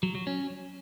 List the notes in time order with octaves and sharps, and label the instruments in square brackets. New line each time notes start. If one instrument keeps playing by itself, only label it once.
[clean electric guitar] F#3
F#3
C#4